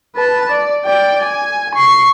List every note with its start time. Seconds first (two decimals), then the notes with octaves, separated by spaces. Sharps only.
0.16 B4 A5
0.52 D5
0.85 D5 G5
1.23 G#5
1.75 C#6 C7